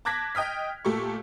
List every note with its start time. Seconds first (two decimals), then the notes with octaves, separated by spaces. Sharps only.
0.05 A5 D6 F#6 G#6 A#6 B6
0.35 D#5 G5 D#6 F6 B6
0.85 A#2 A3 G4 A4 C#6